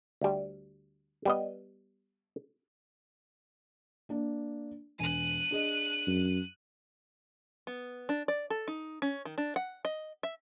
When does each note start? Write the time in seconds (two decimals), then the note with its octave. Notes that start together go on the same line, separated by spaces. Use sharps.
0.21 D2 G3
1.25 G3 B3 D#5
4.09 A#3 D4
4.99 E1 G#5 F#6 D#7
5.51 D4 G#4 D#5
6.07 F#2
7.67 B3
8.09 D4
8.28 D5
8.50 A4
8.68 D#4
9.02 C#4
9.25 D#3
9.38 D4
9.56 F#5
9.85 D#5
10.23 E5